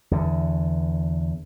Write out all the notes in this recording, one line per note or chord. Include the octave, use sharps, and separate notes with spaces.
E2 D3